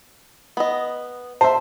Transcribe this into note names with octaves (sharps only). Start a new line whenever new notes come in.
B3 D#5
C5 E5 A5